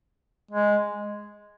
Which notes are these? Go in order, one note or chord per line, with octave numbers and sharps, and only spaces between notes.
G#3